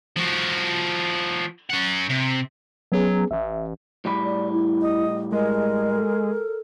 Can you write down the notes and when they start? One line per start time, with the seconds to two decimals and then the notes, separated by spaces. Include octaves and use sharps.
0.16 F3 F#4
1.70 C#4 F#5
2.10 C3
2.92 F#3 B3 C#4 G#4
3.31 A1 E5
4.05 A2 G3 B5
4.24 D5
4.53 E4
4.81 D#5
5.32 G#3 A#4 D#5
5.96 A4